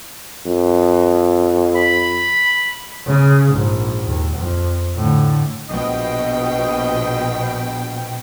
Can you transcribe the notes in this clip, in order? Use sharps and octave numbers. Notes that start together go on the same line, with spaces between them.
F2
B5
C#3
A#1 G#2
D#2
F2
A2 D3
A#1 B2 D#5 G5